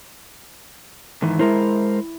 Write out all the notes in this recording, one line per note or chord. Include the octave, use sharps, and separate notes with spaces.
G#2 D#3 E3
G#3 E4 A#4 C5